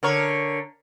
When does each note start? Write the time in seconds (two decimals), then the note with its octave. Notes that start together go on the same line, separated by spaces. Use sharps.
0.03 D3 A#4 C#5